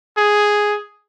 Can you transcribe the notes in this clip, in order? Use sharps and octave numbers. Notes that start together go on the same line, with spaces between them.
G#4